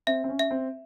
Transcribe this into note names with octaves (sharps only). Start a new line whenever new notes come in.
C4 E5
C4
C#4
E5
C4